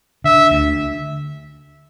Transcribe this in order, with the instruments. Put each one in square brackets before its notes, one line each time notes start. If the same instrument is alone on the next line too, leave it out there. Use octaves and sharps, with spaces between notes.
[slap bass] D3 [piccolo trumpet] E5
[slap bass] D2